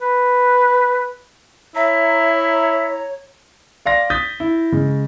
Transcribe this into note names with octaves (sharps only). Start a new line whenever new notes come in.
B4
E4 C#5 E5 A#5
D5 F5 C6 A#6
D#6 G6 A6 B6
E4
C#3 G#3